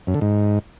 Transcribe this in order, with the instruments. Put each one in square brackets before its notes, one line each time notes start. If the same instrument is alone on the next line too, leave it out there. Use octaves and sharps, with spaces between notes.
[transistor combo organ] F#2
D3
G#2